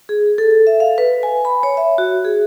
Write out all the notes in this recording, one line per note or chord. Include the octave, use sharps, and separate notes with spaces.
G#4
A4
E5
F5
B4
G#5
B5
C#5
E5
F#4
G#4